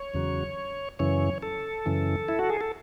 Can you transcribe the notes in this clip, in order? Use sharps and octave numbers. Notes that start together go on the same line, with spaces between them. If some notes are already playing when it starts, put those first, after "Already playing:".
Already playing: C#5
E2 C#3 F#3
F#2 C#3 E3 C#5
A4
F#2 C#3 E3
E4
F#4
G#4
A4